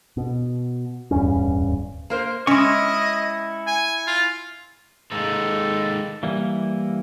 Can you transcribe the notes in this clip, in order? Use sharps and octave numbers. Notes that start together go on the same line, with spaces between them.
B2
D1 E2 G2 C#4
A#3 A#4 C5
G#3 C#4 E4 D#5 C#6
G#5
F4
D#3 G#3 A#3 A4
E3 G3 A#3 E4